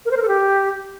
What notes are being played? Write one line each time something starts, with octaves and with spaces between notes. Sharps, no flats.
A#4
C5
A#4
A4
G4